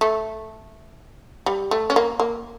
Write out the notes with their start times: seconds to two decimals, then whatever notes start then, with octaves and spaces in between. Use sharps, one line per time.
0.01 A3
1.46 G3
1.71 A3
1.90 C#4
1.96 A#3
2.20 A#3